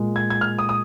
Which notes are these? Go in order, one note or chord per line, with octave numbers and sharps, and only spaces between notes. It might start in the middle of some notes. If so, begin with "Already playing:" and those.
Already playing: A#2 G#3
G#6
G#6
F6
D#6
D#6